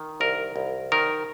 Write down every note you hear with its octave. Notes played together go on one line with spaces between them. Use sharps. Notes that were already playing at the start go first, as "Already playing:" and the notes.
Already playing: D#3
C2 A#4
C2
D#3 A#4